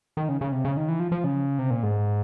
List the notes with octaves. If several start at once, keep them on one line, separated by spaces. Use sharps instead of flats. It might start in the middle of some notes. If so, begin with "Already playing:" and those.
D#3
C#3
C#3
C3
C#3
D#3
E3
F3
F3
C#3
C3
A#2
G#2